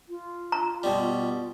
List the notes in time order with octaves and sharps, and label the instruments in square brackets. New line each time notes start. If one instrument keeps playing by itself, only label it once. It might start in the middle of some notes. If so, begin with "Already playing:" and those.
[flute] F4
[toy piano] A#5
[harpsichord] B2 G3